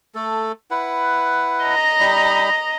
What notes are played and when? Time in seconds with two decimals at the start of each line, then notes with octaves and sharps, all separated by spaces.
0.15 A3 A4
0.71 E4 B4 F#5
1.64 D#5 A#5
2.00 G3 D#4 B5